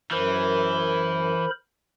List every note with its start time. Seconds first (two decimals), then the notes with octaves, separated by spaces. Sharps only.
0.11 F#2 E3 A#4 C5 B5